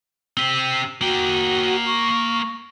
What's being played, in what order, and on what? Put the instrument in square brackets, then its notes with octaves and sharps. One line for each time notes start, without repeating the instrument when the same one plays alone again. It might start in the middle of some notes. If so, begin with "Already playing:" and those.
[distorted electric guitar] C4 G4
[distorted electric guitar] A#3 G5 [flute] F#4
[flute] C#6